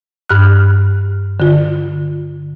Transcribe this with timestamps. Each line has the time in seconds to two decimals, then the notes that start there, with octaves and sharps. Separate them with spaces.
0.29 G2 F6 F#6
1.40 D3 F4